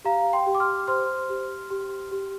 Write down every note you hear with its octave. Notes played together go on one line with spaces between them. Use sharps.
G4 F5 A#5
G5 C6
G4
D6
C6 F6
C5 C6 F6
G4
G4
G4